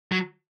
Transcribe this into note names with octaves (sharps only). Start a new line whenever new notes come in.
F#3